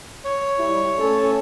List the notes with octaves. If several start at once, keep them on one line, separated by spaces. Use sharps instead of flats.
C#5
G3 E4
A3 C#4 A4